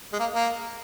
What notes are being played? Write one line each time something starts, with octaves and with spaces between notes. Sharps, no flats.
G#3
A#3
A#3